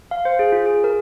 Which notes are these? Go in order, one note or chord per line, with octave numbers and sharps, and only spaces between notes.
F5
C5
G#4
F4
G#4
A#4